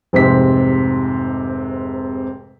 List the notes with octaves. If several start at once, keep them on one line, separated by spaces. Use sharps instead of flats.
F1 G#2 C3 C4 B6